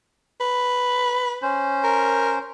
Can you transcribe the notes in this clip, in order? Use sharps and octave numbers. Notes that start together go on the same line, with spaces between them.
B4
C#4 C5
A#4